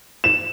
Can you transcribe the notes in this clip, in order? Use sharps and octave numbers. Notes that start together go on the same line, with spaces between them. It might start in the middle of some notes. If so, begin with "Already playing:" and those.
E7